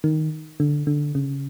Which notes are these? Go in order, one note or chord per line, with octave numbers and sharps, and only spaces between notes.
D#3
D3
D3
C#3